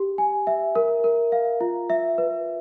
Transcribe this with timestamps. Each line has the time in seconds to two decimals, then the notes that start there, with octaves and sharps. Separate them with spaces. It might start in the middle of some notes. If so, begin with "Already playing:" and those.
Already playing: G4
0.18 G#5
0.47 E5
0.75 A#4
1.04 A#4
1.32 F5
1.61 F4
1.90 E5
2.18 B4